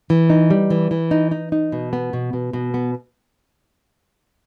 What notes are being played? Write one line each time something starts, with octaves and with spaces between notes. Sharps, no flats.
E3
D#4
G3
E3
E3
D#4
D#4
D#4
B2
B3
B2
B2
B2
B3